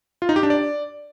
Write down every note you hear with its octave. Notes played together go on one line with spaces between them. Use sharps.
F4
D#4
G4
D4
D5